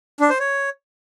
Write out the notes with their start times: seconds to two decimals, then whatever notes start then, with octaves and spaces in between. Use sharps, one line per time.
0.20 D4
0.30 C5
0.40 C#5